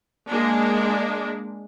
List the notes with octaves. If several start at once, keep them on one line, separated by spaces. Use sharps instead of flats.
G#3 A#3 D4